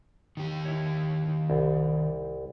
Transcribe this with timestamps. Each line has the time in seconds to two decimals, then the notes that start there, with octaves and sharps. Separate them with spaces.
0.37 D#3 G4
0.65 E4 C#5
1.50 C2